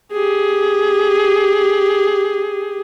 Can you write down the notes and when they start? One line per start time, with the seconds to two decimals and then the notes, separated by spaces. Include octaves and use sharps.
0.12 G4 G#4